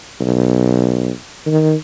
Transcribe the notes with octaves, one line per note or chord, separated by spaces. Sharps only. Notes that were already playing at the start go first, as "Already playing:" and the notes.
B1
D#3